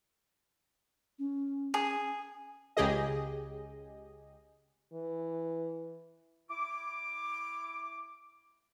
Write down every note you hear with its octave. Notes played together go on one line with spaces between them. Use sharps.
C#4
G#4
C#2 C#3 G4 G#4 D#5
E3
E4 D6